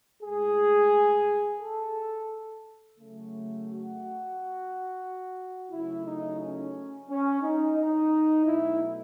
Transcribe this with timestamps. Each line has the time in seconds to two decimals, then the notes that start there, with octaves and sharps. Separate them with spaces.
0.23 A2 G#3 G#4
1.60 A4
2.98 C#3 F#3 A3
3.67 F#4
5.72 C#3 F#3 A3 E4
6.06 D#4
6.41 C#4
7.10 C#4
7.43 D#4
7.78 D#4
8.46 B2 F#3 A3 E4